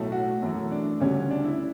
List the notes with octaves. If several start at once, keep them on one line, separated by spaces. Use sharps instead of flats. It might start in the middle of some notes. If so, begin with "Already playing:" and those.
Already playing: B1 A2 F#3 A3
F#4
F#2 E3 A3
D4
D2 C#3 G3 C#4
D4
E4